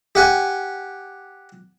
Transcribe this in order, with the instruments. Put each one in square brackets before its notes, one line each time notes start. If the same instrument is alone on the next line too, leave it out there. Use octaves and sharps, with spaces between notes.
[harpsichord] G4 F#5 G#5